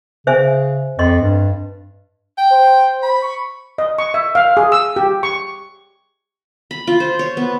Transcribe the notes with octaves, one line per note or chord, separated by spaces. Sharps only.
C#3 C5 E5 G#5
F2 D#5 C6
G2
G5
C5
B5
C#6
D#5
C#6
E5
F5
G#4
E6
G4
C#6
B5
F4
C5
C#5
B3